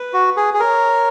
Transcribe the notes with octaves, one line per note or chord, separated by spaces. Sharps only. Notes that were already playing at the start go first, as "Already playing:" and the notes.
Already playing: B4
F#4
G#4
G#4
A#4 C#5